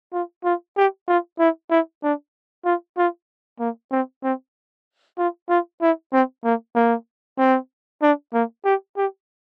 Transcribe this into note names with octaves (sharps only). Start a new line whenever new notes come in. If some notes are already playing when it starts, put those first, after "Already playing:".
F4
F4
G4
F4
E4
E4
D4
F4
F4
A#3
C4
C4
F4
F4
E4
C4
A#3
A#3
C4
D4
A#3
G4
G4